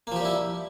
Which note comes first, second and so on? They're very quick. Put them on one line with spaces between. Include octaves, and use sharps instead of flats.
A#3 F3 G4 G3 E4